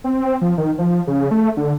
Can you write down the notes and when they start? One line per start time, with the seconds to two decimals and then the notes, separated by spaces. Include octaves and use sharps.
0.04 C4
0.41 F3
0.58 D#3
0.78 F3
1.07 C#3
1.31 A3
1.57 D3